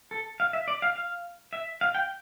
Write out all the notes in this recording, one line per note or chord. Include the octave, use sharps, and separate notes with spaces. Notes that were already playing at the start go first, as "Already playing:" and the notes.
A4
F5
E5
D5
F5
F5
E5
F5
G5